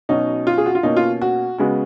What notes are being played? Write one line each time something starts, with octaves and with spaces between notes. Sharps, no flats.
B2 F#3 C#4 D#4
F4
G#4
F#4
F4
B2 A#3 C#4 D#4
F4
F#4
C#3 G#3 B3 F#4